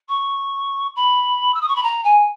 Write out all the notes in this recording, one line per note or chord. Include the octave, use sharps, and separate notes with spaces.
C#6
B5
E6
D#6
C#6
B5
A#5
G#5